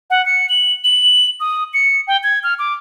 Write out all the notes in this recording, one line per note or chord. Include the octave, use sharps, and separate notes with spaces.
F#5
C#7
F#7
F#7
D#6
C#7
G5
G#6
F6
D6